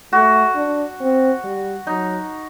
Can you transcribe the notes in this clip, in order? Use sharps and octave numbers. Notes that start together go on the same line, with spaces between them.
A3 F#4
D4
C4
G3
F#3 D#4